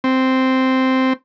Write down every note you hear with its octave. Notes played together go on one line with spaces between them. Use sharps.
C4